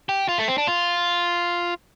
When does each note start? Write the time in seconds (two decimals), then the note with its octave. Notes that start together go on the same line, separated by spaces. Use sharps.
0.09 G4
0.29 F4
0.38 A3
0.48 C4
0.58 D4
0.67 F4